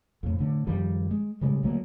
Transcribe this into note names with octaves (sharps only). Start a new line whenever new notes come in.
F2 A2
A2 D3
F#2 D#3 F3 G3
G#3
A2 C#3 G3 G#3
D2 F#3 A#3